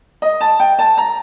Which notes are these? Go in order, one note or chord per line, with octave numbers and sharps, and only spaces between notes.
D#5
A5
G5
A5
A#5